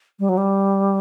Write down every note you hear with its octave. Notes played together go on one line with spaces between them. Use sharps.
G3
F#3
G3